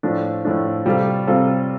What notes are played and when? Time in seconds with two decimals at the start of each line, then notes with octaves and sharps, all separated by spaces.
0.03 A2 F3 A3 D4
0.45 A2 F3 A3 D4
0.85 C3 G3 C4 F4 A4
1.27 C3 G3 C4 F4 A4